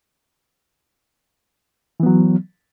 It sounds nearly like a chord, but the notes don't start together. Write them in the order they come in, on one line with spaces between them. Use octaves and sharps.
E3 B3 F#3